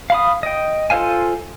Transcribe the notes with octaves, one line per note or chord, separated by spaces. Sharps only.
F5 B5 D#6
D#5 G5
F4 A4 C5 F5 G#5